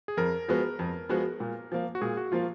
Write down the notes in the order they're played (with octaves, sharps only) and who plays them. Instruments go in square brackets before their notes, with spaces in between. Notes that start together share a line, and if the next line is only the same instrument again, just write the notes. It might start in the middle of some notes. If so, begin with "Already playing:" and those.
[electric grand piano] G#4
[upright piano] F2 [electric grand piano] A#4
[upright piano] F3 G#3 B3 F#4
F2
F3 G#3 B3 F#4
A#2
F3 A#3
[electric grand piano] F#4
[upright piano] A#2 [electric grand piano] G#4
[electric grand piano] F#4
[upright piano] F3 A#3 [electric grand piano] F4